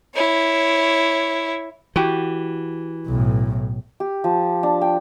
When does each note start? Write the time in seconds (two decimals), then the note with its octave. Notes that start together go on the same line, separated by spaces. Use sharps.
0.15 E4 C#5
1.96 E3 F#4 G4
3.07 B1 A2
4.00 G4
4.24 F3
4.63 D4
4.81 G5